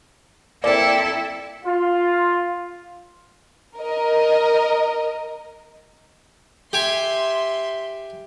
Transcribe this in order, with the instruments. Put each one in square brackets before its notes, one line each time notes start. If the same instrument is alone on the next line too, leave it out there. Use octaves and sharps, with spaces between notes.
[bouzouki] A#3 C4 [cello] E4 A4 [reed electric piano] D5
[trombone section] F4
[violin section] A#4 D#5
[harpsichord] G4 G#5 [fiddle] E5 C6